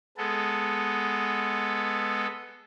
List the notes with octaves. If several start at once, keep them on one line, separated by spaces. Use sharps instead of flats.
G#3 B3 A4